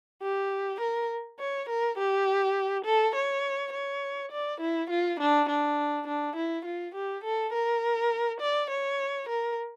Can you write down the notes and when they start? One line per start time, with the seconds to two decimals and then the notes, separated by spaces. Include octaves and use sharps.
0.22 G4
0.81 A#4
1.39 C#5
1.69 A#4
1.98 G4
2.85 A4
3.16 C#5
3.73 C#5
4.32 D5
4.61 E4
4.90 F4
5.20 D4
5.49 D4
6.08 D4
6.36 E4
6.65 F4
6.95 G4
7.24 A4
7.53 A#4
8.41 D5
8.71 C#5
9.29 A#4